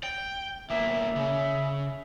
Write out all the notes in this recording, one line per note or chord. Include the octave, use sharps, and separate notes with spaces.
G5
B1 A#3 E5
C#3